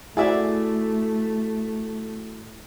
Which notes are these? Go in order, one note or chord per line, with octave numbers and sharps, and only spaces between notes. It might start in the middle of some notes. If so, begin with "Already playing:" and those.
A3 E4 F#4 G#4 D5 E5